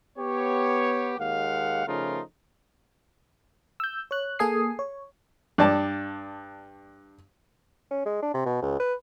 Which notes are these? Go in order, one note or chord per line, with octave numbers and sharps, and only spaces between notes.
B3 G4 C#5
D#2 G#3 A#3 F5 F#5
C#3 F3 A3 D#4 F4 A#4
E6 G6
C#5 F#6
A#3 G#4 A4 G#5 D#6 C7
C#5
G2 D5 A5
C#4
G#3
D4
C3
B2
C#2
B4